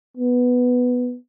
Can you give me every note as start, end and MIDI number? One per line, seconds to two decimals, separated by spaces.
0.17 1.16 59